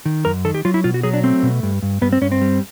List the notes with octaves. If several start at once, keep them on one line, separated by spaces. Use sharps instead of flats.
D#3
F#2 A#4
D#3 A4
G4
F#3 F4
E4
B2 F4
F#4
F#3 G#4
D4
A3 C4
B2
G2
G2
G2 B3
C4
G2 C#4
C4
G3